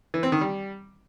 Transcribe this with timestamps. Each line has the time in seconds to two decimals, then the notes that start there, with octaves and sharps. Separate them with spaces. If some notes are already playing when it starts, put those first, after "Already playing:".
0.14 E3
0.23 C4
0.32 D#3
0.41 G3